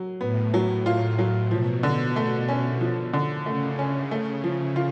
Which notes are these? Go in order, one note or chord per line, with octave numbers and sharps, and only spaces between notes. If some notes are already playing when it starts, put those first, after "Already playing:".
Already playing: F#3
A2 B3
F#3
A2 F4
A2 F#3
B2 F3
D3
A3
C#4
F3
D3
C#3 A3
C#4
A3
F3
F4